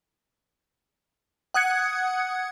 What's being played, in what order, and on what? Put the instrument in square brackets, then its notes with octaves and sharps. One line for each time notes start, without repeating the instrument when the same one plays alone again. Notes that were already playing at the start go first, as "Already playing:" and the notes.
[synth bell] F#5 D#6 F#6 G#6 C#7